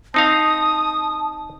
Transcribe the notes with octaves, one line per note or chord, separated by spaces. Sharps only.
C4 D#4 F5 A5 D#6